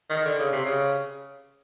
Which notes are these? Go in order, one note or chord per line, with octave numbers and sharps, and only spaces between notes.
D#3
D3
C#3
C3
C#3